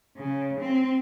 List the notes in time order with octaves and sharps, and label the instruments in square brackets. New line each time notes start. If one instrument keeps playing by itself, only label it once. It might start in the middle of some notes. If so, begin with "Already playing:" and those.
[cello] C#3
C4